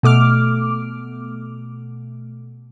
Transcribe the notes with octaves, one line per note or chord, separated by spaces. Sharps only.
B2 A3 D6 F6